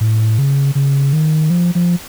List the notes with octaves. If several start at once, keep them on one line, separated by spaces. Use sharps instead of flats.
A2
C#3
C#3
D#3
F3
F3